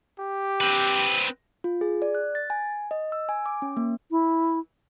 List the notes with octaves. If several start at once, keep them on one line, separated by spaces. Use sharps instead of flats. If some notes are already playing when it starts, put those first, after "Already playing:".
G4
C4 B4
F4
G#4
D5
F#6
A6
G#5
D#5
E6
G#5
D6
C#4
A#3
E4